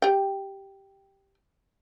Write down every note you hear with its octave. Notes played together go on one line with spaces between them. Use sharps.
G4 G5